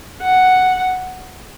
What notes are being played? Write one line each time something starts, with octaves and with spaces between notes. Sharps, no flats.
F#5